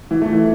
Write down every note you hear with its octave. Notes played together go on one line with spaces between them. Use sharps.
E3
A3
E3